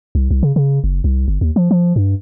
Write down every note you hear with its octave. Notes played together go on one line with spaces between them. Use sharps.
C2
C2
C#3
C#3
F#1
C2
G1
D#2
F3
F3
G2